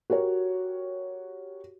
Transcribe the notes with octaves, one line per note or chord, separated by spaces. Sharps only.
F#4 G4 A#4 C#5